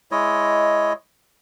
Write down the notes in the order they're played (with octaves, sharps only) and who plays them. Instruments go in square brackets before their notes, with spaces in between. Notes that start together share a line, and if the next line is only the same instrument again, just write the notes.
[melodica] G#3 E4 C#5 D#5